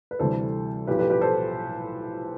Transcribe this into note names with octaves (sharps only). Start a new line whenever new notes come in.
B4
D2 C3 E3 G3 A4 C5
B1 A2 F3 G4 B4
G4 B4
G4 B4
A4 C5